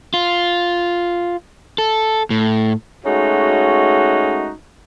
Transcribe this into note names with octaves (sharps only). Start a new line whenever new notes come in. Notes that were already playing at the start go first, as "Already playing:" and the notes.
F4
A4
A2
G#3 A3 C#4 D#4 F#4